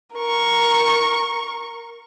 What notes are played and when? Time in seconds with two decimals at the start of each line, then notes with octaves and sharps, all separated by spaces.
0.14 A#4 C#6